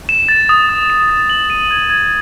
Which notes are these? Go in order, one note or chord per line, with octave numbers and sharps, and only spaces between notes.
E7
A6
D#6
D#6
E7
A6
F#7
D#7
G#6
G#6